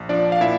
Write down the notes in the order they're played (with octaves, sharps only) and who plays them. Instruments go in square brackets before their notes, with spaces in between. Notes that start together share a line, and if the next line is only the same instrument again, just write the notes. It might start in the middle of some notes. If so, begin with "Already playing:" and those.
Already playing: [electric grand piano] A#1
F3 D4 D5
F5
A#2 E4 E5